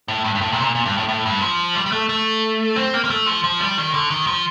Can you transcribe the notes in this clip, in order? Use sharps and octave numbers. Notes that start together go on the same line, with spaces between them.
A2
G2
G2
A2
A#2
C3
A#2
A#2
G2
A2
A2
G2
F3
G3
G3
A3
A3
C4
A#3
A#3
A3
F3
F3
G3
D#3
D3
D#3
F3